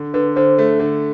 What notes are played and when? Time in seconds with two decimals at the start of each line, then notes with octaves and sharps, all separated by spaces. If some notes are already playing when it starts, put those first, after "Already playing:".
Already playing: D3
0.14 D3 B4
0.36 D3 C5
0.59 A3
0.80 D3